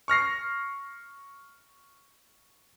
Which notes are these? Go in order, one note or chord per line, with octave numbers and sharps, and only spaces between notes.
C#6 F6 A#6 C7